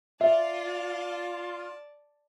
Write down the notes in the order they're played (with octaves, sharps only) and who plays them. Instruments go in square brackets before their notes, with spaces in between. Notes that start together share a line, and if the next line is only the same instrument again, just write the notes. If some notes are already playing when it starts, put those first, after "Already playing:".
[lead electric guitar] F4 [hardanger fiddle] D5 A5 [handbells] E5